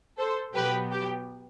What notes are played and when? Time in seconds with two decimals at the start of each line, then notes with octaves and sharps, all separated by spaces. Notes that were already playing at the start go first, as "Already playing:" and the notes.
0.18 A4 C5
0.55 B2 F#3 B3 G4 B4
0.91 G4